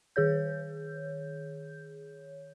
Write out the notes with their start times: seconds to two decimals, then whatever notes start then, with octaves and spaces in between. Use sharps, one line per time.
0.16 D#3 G#4 C#5 G6